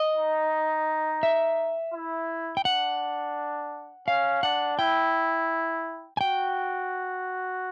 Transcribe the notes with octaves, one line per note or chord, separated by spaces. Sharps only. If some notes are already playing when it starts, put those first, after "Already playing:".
Already playing: D#5
D#4
E5
E4
G5
D4 F#5
C#4 F5
D4 F#5
E4 G5
G#5
F#4 G5